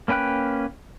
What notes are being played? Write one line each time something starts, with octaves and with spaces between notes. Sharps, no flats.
A#3 C#4 B4 G5 F#6